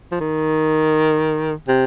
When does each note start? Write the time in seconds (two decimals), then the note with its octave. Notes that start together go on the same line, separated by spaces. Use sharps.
0.12 F3
0.20 D#3
1.68 C3